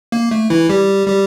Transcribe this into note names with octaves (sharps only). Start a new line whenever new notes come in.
A#3
A3
E3 E4
G3 G4
G3 G4